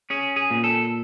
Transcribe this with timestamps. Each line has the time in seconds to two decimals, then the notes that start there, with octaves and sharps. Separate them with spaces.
0.10 C#4 G#4
0.36 G#4
0.51 A#2
0.64 A4